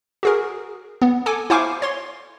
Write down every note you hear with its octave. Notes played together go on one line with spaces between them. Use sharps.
F#4 G#4 A#4
B3
A4 G#5 D6
E4 C5 F5 G#5 C#6 D6
C#5 C6